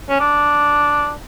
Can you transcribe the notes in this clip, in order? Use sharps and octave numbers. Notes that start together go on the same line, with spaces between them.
C#4
D4